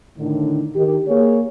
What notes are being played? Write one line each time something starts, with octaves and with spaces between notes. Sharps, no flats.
A2 D3 D#3
D#3 G4
A#3 G#4 C#5